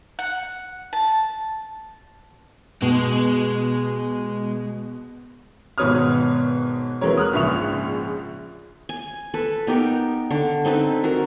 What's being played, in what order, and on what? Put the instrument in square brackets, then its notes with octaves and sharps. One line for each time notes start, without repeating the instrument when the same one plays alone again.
[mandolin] F#5
A5
[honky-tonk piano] B2 [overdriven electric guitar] G#3
[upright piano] G#1 B2 B4 C#5 D#6 F6
E3 F#3 G#3 C4 A#4 C#5
D#6 F6 F#6
A#1 G#2 C#3 E5 C#6 F7
[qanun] G#5
A4 B4
B3 D#4 G4 A#4
D3
C4 D#4 A4 B4
F#4 A#4